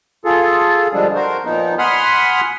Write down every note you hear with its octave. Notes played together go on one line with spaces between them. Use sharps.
F4 G#4 A4
D3 F3 G3 G#3 D4
F#4 A#4 C5
A#2 F3 B3 D#4
F#5 G#5 B5 C6 D#6 F6